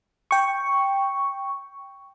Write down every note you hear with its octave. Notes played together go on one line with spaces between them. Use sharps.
G5 C#6